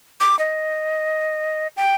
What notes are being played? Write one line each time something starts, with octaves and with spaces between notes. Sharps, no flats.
D6
D#5
G5